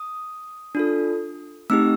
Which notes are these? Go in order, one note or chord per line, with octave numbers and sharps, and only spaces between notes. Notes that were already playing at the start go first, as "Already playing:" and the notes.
Already playing: D#6
D4 F4 A4
A3 C4 D#4 G4 E6